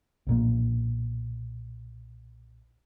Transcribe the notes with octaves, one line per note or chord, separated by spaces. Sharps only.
B1 A#2 A#3